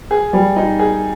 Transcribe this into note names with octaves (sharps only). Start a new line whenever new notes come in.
G#4
G3
D#4
G#4